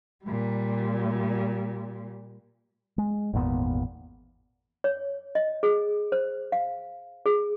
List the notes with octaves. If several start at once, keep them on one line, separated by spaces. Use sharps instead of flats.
A#2 G3
G#3
G#1 E2 A#2 B3
C#5
D#5
G#4
C5
F5
G#4